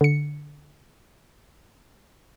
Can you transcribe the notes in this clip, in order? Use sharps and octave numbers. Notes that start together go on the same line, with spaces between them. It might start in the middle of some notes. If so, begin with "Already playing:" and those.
D3 C#7